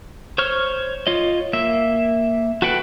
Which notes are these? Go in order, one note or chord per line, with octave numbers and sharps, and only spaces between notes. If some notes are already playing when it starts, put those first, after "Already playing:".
C5 C#5 C#6 F6
F4 C#5 D#5
A#3 E5
F#4 A4 B4 F#5 G5